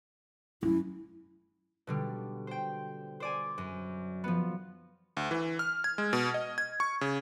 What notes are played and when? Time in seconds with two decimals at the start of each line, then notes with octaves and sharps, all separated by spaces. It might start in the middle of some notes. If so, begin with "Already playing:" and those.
0.63 F#2 E4
1.87 B2 D3 G3
2.47 C5 G5
3.20 C5 D5 G#5
3.58 F#2
4.24 F3 B3
5.17 D2
5.31 E3
5.59 F6
5.84 G#6
5.98 G#3
6.13 B2
6.34 D#5
6.58 G#6
6.80 C#6
7.01 C#3